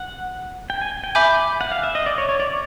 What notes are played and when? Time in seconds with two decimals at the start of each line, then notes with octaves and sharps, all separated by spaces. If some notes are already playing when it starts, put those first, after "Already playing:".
Already playing: F#5
0.70 G5
0.81 G#5
1.04 G5
1.15 E5 G#5 B5 D6 G6
1.61 F#5
1.72 F5
1.84 E5
1.95 D#5
2.06 D5
2.18 C#5
2.29 C#5
2.40 D5